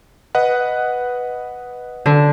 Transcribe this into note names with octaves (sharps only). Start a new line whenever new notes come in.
B4 D#5 F#5
D3